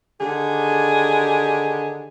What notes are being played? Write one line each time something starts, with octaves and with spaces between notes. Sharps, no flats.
D3 D#3 G4 G#4